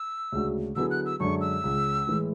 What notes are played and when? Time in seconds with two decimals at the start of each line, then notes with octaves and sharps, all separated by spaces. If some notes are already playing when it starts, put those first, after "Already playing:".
Already playing: E6
0.32 D2 C#3 G#3 D4 F#4
0.76 D3 F#3 B3 E4 G#4 E6
0.91 F#6
1.06 E6
1.20 F#2 D3 G#3 D4 C#6
1.41 E6
1.63 C#2 C#3 G#3
2.07 A2 E3 G#3